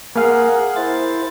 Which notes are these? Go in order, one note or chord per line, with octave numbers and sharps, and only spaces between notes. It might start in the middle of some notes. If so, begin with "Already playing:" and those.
A#3 G#4 A#4 F5 F#5
E4 C5 A6